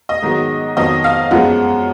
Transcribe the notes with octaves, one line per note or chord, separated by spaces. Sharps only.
D#5
G#2 D#3 F#3 B3
F2 D#3 F#3 B3 D#5
F5
F#2 F3 G#3 B3 F#5